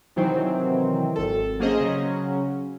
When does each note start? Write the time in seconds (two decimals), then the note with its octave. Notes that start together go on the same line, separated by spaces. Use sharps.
0.16 C3 D#3 E3 F#3 C4
1.16 G#1 A4
1.60 F#3 A#3 C#4 G#4 C5 D#5
1.81 C#3 F#3 C#4